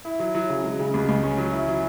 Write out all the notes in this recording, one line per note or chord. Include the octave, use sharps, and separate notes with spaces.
E4
F#3
F#3
C#3
G#3
C#3
C#2
C#2
C#4
F#3
E4
F#3